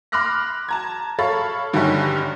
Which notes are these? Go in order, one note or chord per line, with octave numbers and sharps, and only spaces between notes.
B5 C6 D6 F6 F#6 A#6
A5 A#5 G#6
A4 C#5 F5 B5 A6
G2 D3 D#3 G3 C#4 D#4